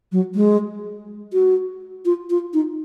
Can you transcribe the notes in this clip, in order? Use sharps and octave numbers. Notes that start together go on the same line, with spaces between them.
F#3
G#3
F#4
F4
F4
D#4